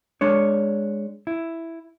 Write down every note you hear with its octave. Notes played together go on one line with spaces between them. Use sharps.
G#3 D4 C#5
E4